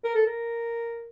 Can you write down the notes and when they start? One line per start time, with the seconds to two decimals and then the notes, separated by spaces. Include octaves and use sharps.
0.04 A#4
0.15 A4
0.26 A#4